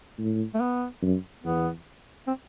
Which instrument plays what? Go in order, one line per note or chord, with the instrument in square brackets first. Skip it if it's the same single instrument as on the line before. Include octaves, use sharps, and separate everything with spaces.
[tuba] A2
[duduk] A3
B3
[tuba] F#2
[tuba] E2 [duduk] B3
[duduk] C4